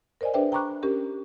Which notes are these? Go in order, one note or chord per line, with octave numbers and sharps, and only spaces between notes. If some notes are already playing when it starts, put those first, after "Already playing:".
A#4 C5 D5 D#5 G#5
D4 G#4 B4 C5 E5 G5
G5 A#5 B5 C#6 D6 F#6
C#4 G4 A#4